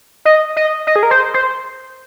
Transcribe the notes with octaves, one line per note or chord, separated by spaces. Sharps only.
D#5
D#5
D#5
G#4
A#4
C5
C5